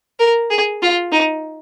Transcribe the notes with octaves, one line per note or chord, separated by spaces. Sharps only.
A#4
G#4
F4
D#4